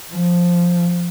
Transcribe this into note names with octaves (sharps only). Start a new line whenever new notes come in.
F3